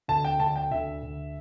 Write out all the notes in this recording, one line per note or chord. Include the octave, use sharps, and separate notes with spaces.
D2 D3 A5
G5
D2 D3 A5
G5
D2 D3 E5
D2 D3